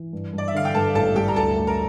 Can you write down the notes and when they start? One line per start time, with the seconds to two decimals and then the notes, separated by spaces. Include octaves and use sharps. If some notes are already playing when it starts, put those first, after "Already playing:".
Already playing: E3
0.13 G2
0.33 G2 D5
0.48 E5
0.54 D3 F5
0.65 G5
0.74 G2 A4 A5
0.95 A1 A4 A5
1.15 G2 G4 G5
1.28 A#5
1.36 D2 A4 A5
1.57 A3
1.67 A#4 A#5